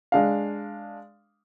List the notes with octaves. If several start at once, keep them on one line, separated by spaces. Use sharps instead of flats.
G#3 D4 F5